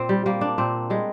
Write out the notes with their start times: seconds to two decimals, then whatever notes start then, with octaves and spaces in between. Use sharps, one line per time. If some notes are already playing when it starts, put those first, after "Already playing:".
Already playing: A#2 C4
0.09 G3
0.26 G3 A#3
0.41 D4
0.58 A#2 C4
0.90 G3 G#3